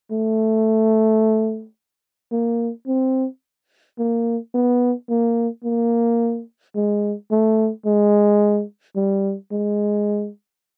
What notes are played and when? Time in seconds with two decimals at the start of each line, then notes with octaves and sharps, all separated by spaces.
0.11 A3
2.32 A#3
2.87 C4
3.99 A#3
4.54 B3
5.10 A#3
5.64 A#3
6.75 G#3
7.31 A3
7.86 G#3
8.96 G3
9.52 G#3